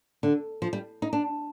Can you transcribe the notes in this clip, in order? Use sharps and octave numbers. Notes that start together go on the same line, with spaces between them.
D3
F3
G3
D#4
D4